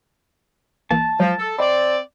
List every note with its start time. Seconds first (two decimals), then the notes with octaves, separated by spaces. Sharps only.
0.91 G1 E3 A#3 A5
1.20 F3 F#3 G#3
1.39 A4
1.59 C4 D5 D#5 B5